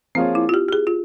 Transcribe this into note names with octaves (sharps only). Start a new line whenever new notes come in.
F3 A#3 C4 F4 G#4 C#5
E4
F4
G4
G4
G#4
F4